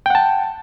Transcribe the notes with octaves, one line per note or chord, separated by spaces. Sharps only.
F#5 G5 A5